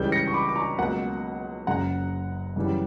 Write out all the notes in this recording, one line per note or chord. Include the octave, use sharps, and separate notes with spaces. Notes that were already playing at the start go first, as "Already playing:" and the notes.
Already playing: C#2 C#3 E3 G3 G6
A#6 C#7
C#6
B5 D6
D6
A#5 C#6
C#2 B2 F#3 A#3 F#5 A#5
F#1 F#2 C#3 F#5 A#5
F#2 C#3 E3 G3